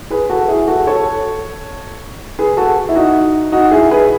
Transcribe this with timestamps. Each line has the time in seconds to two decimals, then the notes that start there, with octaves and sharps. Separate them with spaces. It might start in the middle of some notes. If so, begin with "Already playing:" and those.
0.10 G#4 B4
0.30 F#4 A4
0.48 E4 G#4
0.68 F#4 A4
0.87 A4 C#5
2.39 G#4 B4
2.57 F#4 A4
2.89 E4
2.96 D#4 F#4
3.52 D#4 F#4
3.71 E4 G#4
3.91 G#4 B4